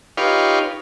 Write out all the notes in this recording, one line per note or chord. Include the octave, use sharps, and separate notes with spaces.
D#4 F4 G4 B4 C#5 F5